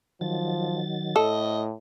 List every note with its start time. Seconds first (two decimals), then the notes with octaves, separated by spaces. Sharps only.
0.21 D#3 F3 F#3 A6
1.16 A2 A4 D#5